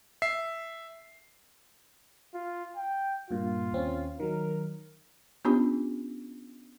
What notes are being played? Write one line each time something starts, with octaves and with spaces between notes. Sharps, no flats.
E5 C7
F4
G5
G2 A#2 F4
D#2 C4 C#4
D#3 F#3 A#4
B3 C#4 D4 F4 G4